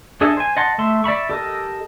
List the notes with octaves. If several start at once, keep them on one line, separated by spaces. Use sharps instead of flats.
D4 G#4 A4 D#5 E5
C5 G#5
D#5 F#5 A5 C6
A3 E5 C6
D5 E5 B5 C#6
G4 A4 A#4 D#5